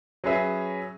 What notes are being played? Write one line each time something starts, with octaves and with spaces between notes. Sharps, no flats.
F#3 C#4 G#4 B4 E5